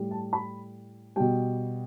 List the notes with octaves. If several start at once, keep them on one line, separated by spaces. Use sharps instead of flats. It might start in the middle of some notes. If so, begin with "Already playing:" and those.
Already playing: A2 G3
A5
B5
B2 G3 G5